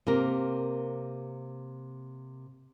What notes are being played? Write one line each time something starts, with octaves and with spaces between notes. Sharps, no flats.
C3 A#3 A#4